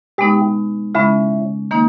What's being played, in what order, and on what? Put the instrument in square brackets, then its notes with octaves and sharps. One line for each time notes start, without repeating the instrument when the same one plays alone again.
[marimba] B2 G#3 B3 D#4 [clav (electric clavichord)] G4
[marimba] C#3 G#3 C#4 [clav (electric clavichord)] E4
[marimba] D#3 A#3 D#4